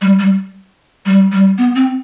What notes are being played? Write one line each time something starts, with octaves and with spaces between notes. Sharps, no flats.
G3
G3
G3
G3
B3
C4